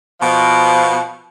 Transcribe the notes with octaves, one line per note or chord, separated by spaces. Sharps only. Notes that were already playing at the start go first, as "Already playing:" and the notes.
B2 F3